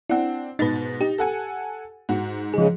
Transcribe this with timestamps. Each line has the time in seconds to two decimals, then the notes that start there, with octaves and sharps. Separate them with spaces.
0.10 C4 D4 E4 F#5
0.59 G#2 B2 D#4 B4 A6
1.01 D#4 G4
1.18 A4 F#5 G#5
2.09 G#2 F#4
2.54 C#3 F3 G#3 G#4